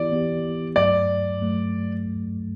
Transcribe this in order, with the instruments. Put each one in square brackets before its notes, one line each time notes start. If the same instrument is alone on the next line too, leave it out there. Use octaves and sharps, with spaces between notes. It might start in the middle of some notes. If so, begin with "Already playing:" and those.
Already playing: [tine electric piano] E3 B3 E4 G4 [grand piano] D5
[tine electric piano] E3 B3 E4 G4
[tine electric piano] G2 F#3 A3 [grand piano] D5
[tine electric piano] G2 F#3 A3